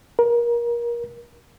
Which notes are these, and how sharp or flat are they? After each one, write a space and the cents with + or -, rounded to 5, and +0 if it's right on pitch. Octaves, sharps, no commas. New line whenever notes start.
A#4 +25